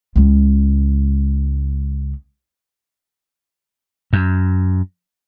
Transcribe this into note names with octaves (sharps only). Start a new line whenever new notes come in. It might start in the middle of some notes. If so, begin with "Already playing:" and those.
C#2 G#3
F#2